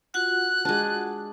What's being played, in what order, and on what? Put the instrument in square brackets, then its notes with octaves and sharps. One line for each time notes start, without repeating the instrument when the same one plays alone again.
[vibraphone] F4 F#4 F#5 [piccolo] F#6
[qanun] G#3 D4